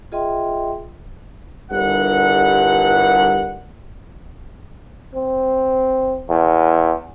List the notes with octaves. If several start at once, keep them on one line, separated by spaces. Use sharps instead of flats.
F4 G#4 D#5 E5 G5 C6
G1 G2 D3 E4 A#4 F#5
C4
E2